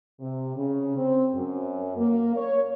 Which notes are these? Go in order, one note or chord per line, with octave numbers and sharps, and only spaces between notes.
C3
C#3
C4
F#2
A#3
C#5